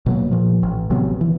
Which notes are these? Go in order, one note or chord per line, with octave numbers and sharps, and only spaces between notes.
B2 F#3 A#3
A#2 F3
A1
A1 C3 F#3 B3
E3